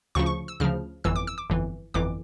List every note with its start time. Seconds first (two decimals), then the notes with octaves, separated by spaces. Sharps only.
0.15 D2 C#3 F3 C#6
0.26 C#6
0.48 E6
0.60 D2 C#3 F3 F6
1.04 G1 F2 E3 E6
1.16 D6
1.27 E6
1.38 D6
1.50 G1 F2 E3
1.94 G1 F2 E3 D6